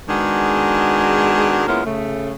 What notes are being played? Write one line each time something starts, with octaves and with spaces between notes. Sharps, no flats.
D#3 G#3 B3 D4 F#4 G#4
G#3 A#3 B3 C#4 E4 F4
C#3 A3